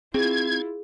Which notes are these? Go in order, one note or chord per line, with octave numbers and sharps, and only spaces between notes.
C4 E4 F4 G#4 G#6